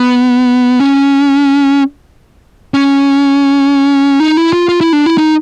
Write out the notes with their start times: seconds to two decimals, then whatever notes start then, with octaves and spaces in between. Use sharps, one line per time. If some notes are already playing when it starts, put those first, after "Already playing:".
Already playing: B3
0.80 C#4
2.74 C#4
4.20 D#4
4.37 E4
4.53 F4
4.69 F4
4.81 E4
4.93 D4
5.06 E4
5.18 D#4